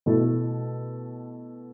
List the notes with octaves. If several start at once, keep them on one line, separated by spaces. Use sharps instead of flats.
B2 A3 E4 A4